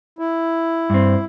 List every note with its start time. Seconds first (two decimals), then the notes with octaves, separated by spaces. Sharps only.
0.19 E4
0.90 G2 C4